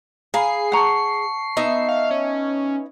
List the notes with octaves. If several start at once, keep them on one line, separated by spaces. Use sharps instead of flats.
G#4 F5 G#5 A#5 B5 C7
F#5 A5 A#5 C#6 C#7
B3 D#4 E5
F5
C#4